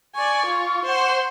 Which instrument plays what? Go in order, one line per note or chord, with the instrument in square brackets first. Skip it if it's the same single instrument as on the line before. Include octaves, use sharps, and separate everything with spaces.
[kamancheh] D5 G#5 [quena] C#6
[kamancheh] F4
C5 F#5